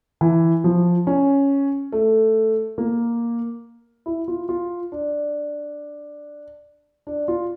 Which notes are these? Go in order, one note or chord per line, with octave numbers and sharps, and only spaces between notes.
E3
F3
C#4
A3
A#3
E4
F4
F4
D4
D4
F4